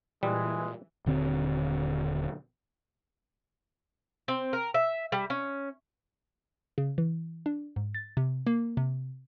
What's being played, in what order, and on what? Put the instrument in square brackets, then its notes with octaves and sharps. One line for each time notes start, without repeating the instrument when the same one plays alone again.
[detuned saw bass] A#2 [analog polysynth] E3 [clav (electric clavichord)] G3 [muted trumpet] G#3
[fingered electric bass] D#1 D3 C4
[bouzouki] C4
A#4
E5
G3
C#4
[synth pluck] C#3
E3
D4
G#2
A6
C3
A#3
C3